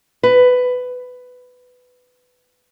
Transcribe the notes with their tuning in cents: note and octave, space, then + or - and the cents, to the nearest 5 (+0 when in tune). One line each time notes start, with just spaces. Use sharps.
B4 +15